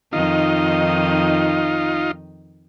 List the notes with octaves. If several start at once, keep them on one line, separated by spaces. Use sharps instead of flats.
F2 D#3 D#4 F4 D#5